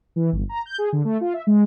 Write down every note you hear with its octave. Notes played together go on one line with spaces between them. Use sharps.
E3
G1
A#5
G6
G#4
D3
A3
F4
E5
G#3